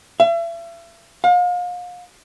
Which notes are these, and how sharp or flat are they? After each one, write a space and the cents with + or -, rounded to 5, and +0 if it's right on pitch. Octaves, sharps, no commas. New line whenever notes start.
E5 +40
F5 +35